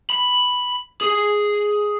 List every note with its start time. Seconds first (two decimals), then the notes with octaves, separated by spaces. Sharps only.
0.10 B5
1.01 G#4